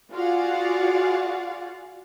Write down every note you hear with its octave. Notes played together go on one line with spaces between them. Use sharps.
F4 F#4 G#4 D5 F5 F#5